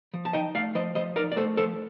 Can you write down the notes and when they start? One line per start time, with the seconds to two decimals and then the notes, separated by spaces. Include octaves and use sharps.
0.13 F3
0.25 A5
0.33 D#4 D#5 G5
0.55 A3 D5 F5
0.75 F3 C5 D#5
0.95 F3 C5 D#5
1.16 D#4 A#4 D5
1.32 D5
1.36 A3 A4 C5
1.57 F3 A4 C5